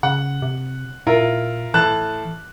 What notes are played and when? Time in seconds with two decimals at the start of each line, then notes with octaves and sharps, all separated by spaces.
0.03 C#3 F#5
0.42 C3
1.07 A#2 E4 F4 A#4
1.74 A2 E3 A5 F#6